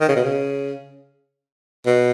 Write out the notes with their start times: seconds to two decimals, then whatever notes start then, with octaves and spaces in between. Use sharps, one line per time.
0.01 D#3
0.08 C#3
0.16 B2
0.24 C#3
1.86 B2